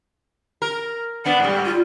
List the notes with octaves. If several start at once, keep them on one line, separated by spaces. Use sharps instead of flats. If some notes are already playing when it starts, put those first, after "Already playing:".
A#4
B3 D4 F#5
G#2 G3
F4